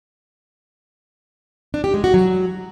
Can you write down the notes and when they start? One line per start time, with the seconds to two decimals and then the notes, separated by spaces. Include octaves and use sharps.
1.74 D4
1.84 G4
1.94 G#3
2.04 F#4
2.14 F#3